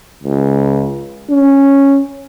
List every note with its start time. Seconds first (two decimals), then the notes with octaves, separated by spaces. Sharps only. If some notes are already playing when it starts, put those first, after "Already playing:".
0.24 C#2
1.30 C#4